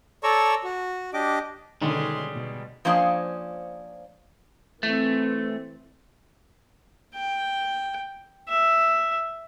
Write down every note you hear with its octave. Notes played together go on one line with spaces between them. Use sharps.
A4 C#5 D5 A#5 C#6 E6
F#4
D4 G4 D#5 D6
B2 D3 D#3 G3 G#3 C#4 D#4 C6
B2
F3 A#3 C#4 D4 C5 D#5
E3 A3 C4
G5
E5